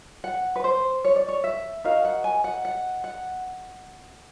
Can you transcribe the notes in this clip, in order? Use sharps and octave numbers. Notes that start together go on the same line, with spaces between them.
F#5
B4
C5
C#5
D5
C#5
E5
D#4 F#4 A#4 F5
F#5
G#5
F#5
F#5
F#5